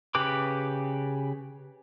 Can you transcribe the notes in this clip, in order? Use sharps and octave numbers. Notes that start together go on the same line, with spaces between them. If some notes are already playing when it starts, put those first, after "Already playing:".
C#3 G4 B4 D6